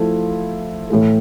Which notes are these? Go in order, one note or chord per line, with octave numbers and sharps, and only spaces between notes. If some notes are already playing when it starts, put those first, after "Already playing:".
Already playing: F3 A3 E4
A2 E3 A3